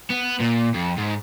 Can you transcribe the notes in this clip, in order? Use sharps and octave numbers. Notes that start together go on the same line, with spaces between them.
B3
A#2
F2
G#2